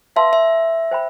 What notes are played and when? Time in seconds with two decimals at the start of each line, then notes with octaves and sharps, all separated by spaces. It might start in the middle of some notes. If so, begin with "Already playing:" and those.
0.16 B4 E5 F5 A5 C6
0.33 E5
0.91 C5 G5 B5